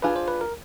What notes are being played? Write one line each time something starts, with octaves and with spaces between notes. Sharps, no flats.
D4 F4 G#4 B4
C5
B4
A#4